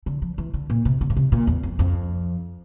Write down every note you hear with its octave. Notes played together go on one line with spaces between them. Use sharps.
D3
F3
E3
D3
A#2
C3
D3
A#2
C3
A#2
E2
F2
F2